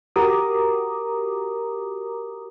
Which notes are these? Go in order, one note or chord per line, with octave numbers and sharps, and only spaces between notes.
F#4 G4 A#4 A#5 D6 D#6